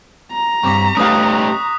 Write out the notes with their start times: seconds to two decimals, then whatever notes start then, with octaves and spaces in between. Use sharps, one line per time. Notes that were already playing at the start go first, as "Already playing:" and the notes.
0.33 A#5
0.63 G2 C4 C#6 D6 B6
0.97 A3 C#4 D#4 G4 B4 F5 D#6 F#6